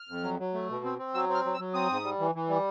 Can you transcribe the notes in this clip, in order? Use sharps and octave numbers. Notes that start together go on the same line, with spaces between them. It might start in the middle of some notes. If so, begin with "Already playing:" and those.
Already playing: F6
F2
F#3
F#3
A3
B2
C4
C4
F#3 E6
C4
F6
F#3
E6
F#3
C4 D#6
G#2
G3
E3
E3
G3